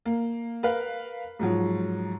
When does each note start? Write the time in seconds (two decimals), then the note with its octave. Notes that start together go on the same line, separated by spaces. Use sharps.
0.05 A#3
0.63 A#4 B4 F5
1.39 G#2 F3 F#3